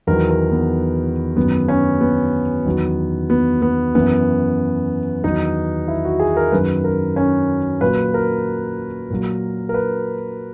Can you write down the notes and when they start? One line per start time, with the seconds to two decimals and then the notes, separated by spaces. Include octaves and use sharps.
0.07 E2 D#3 F#3 A#4
0.30 A#4
0.51 B3
1.36 F#2 D#3 F#3 B3
1.68 C#4
2.01 B3
2.65 E2 D#3 F#3
3.30 B3
3.62 B3
3.95 F#2 E3 B3
5.23 E2 D#3 F#3 D#4
5.88 E4
6.05 F#4
6.20 G#4
6.37 A#4
6.52 F#2 D#3 F#3 B4
6.84 A#4
7.16 C#4
7.81 A#2 F#3 B4
8.14 A#4
9.10 A#2 F#3
9.69 A#4
9.74 B4